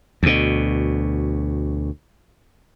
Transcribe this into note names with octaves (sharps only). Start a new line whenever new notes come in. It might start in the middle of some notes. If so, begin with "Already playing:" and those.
D2 B2